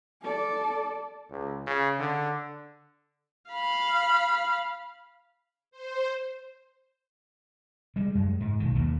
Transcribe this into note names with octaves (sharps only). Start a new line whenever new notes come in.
A4 D5
C#2
C#3
D3
F5 B5
C5
G3 G#3
F#2 G#3
G#2
B1 D#3
D#2 A#2